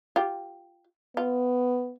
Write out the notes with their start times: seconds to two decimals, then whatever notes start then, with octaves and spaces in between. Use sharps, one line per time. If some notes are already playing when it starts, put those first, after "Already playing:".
0.16 F4 G4
1.17 B3 F4